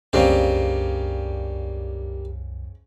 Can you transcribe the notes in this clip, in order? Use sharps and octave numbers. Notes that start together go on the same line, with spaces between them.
C2 F#2 C#3 G3 A#3 C4 D4